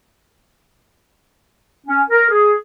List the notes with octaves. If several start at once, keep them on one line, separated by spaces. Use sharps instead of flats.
C#4
A#4
G#4